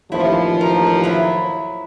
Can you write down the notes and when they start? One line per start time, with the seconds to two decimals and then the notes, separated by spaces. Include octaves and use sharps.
0.12 A1 D#2 F3 E4
0.61 A#4
1.04 F#3 E4